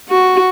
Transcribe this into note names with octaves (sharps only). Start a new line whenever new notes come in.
F#4